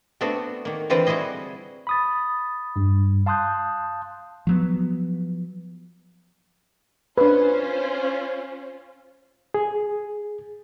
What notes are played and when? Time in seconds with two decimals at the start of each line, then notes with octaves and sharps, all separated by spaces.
0.21 A3 B3 C4 D4 F#4
0.65 D#3 A#3
0.90 D3 E3 C4 F4 B4 C5
1.07 G3 E4 F#4 G#4 D#5
1.87 B5 D#6 A6
2.76 G2 G3
3.26 F5 A5 C6 D#6 F#6 G6
4.47 F3 F#3 B3
7.18 C#4 D4 F4 B4 C5
9.54 G#4